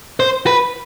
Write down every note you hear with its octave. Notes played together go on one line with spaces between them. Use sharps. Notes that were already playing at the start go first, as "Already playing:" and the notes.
C5
B4